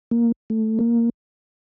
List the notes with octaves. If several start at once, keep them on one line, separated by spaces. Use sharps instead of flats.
A#3
A3
A#3